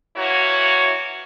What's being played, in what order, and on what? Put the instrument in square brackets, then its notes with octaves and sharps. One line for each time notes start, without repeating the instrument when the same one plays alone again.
[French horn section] E3 A#3 E4 F#4 C#5